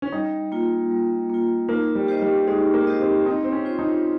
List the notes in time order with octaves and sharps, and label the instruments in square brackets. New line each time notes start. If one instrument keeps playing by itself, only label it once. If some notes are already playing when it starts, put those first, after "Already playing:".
[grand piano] C#4
[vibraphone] G3 [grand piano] D#4
[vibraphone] A#3 F4
G3
A#3 F4
[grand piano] A#3 [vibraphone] D#4
[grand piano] G3
[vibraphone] G4 C5 D#5
[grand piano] G3
[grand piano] G#3 [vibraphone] D#4
[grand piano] A#3
[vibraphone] G4 C5 D#5
[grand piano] C4
[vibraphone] C4 [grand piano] D#4
[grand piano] C4
C#4
[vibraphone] F4 C5 D#5
[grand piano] D#4